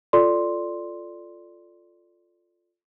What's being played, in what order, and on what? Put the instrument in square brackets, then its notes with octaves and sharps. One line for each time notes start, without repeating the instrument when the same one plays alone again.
[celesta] F4 A4 D5 C6